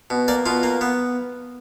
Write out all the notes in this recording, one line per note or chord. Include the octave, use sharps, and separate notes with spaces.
B2
A#3 D5
B2 F4
A#3
B3